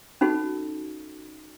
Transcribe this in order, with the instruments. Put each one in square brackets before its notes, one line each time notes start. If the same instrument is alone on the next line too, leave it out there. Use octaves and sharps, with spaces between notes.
[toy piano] C#4 D#4 F#4 A4